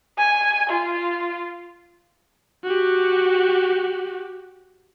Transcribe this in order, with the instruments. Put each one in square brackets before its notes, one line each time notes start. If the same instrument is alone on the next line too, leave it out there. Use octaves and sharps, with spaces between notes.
[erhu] G#5
F4
[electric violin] F#4 G4